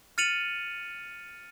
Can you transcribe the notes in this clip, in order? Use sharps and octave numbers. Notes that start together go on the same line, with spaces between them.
F6 A6 C#7 D#7 F7 F#7